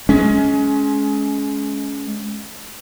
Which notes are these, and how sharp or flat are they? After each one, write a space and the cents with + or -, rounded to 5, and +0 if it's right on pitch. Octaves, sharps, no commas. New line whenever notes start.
G#3 +30 C#4 +15